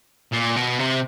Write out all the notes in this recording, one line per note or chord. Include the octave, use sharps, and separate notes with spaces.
A#2
B2
C3